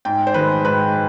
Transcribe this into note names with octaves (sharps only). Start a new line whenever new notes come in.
G#2 G5
C5
D#3 G#3 B4
G#2 B4